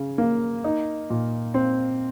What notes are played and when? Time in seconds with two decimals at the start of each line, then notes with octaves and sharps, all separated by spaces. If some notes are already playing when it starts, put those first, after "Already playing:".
Already playing: C#3
0.18 A#3
0.64 D#4
1.10 A#2
1.54 C4